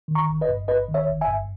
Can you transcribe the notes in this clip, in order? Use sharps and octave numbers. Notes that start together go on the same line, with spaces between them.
D#3
A#5 C#6
G1
B4 D#5
G2
G1 B4 D#5
D#3
C#5 E5
G1
E5 G#5
G2